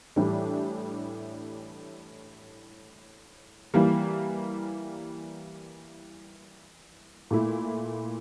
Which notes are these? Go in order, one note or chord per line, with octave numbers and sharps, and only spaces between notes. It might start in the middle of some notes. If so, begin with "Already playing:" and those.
A2 E3 G3 D4 G4
E3 G3 A#3
A#2 A3 E4